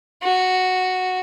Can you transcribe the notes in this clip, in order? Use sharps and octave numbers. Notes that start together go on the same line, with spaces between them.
F#4